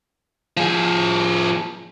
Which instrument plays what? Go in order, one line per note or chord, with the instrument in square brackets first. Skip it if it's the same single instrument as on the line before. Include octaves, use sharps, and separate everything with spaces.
[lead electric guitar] F3 G#4